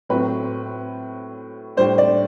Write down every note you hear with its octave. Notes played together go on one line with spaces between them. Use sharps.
A2 F#3 C4 B4
A2 G3 D4 C5
D5